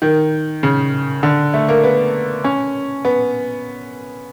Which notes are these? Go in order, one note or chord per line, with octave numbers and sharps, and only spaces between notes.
D#3
C#3
D3
A3
A#3
B3
C#4
B3